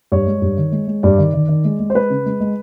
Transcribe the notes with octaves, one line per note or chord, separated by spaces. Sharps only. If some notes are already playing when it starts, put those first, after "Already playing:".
G2 C#5
G#3
G2
D#3
G#3
G#3
G2 D5
D#3
D#3
D#3
G#3
G#3
C5
G#3 B4
C#3
G#3
G#3